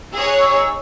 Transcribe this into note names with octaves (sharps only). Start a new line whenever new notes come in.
D#4 G#4 C#5 E6
F#6
C#6 E6